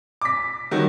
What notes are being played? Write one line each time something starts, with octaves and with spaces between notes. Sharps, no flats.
D6 B6
D#3 F#3 G3